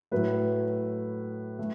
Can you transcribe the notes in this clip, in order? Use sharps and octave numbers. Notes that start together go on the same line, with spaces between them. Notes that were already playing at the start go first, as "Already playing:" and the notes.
A2 F#3 A3 B4
A3